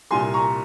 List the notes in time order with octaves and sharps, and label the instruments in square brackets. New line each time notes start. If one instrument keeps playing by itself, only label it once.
[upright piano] C2 A#2 G3 G#5 C6
A#5 C#6